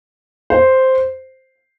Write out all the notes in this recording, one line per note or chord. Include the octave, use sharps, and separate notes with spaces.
C5